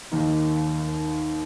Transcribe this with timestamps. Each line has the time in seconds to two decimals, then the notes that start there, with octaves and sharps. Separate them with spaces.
0.12 D#2 D#3 A#3 D#4